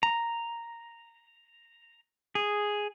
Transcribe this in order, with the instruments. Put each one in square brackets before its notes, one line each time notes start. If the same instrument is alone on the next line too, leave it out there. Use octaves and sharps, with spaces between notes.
[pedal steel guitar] A#5
G#4